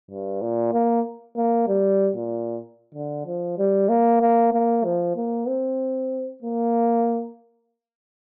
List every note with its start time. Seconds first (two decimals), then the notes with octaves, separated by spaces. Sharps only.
0.11 G2
0.42 A#2
0.73 A#3
1.37 A#3
1.68 G3
2.16 A#2
2.95 D3
3.26 F3
3.58 G3
3.89 A#3
4.21 A#3
4.53 A#3
4.84 F3
5.17 A#3
5.48 C4
6.42 A#3